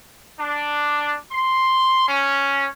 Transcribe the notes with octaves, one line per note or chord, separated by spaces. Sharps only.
D4
C6
C#4